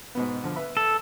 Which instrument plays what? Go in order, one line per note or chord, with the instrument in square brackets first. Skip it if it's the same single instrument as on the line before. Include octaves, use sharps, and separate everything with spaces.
[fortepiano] G#2 B2 B3
D3 F3
B4 E5 B5
[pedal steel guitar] A4